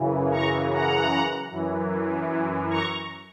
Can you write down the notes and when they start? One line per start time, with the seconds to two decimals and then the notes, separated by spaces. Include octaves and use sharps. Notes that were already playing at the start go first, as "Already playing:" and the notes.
Already playing: F#2 C#3 E3
0.32 A#5 C#6
0.71 F#5 A#5
1.51 F#2 E3
2.70 A#5 C#6